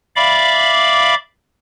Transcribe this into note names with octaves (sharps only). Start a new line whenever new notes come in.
D5 E5 F5 B5 D6